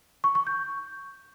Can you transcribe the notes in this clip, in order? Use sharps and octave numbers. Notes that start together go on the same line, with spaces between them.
C#6
C#6
G6